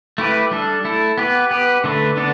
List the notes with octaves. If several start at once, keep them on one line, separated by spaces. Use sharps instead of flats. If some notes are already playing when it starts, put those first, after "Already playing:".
A3 E4 G4 B4
G3 D4 A4
A3 E4 A4
B3 G4 B4
B3 G4 B4
D3 A3 D4 B4
D3 B3 D4 A4